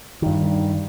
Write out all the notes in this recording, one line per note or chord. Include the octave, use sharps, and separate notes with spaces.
G2 D#3